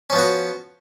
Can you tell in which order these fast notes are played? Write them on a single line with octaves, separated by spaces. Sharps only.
C#4 F3 B3 F#4